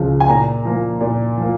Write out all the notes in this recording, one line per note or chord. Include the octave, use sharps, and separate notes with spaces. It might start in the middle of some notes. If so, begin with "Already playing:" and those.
Already playing: C#2 C#3 F3
G#5
A#2 A#5
F3 A#3
A#2
F3 A#3